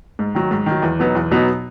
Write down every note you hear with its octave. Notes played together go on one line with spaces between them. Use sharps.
G#2
D#3 F#3
G#2
D#3 F#3
E2
B2 F#3 B3 D#4
E2
B2 F#3 B3 D#4